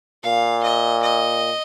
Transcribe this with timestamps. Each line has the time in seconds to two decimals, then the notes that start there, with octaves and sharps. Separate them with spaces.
0.23 A#2 F5
0.63 D#5
1.02 D#5